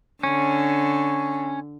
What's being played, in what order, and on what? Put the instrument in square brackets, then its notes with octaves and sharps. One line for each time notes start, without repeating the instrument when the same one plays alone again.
[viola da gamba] D3 [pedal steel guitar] C#4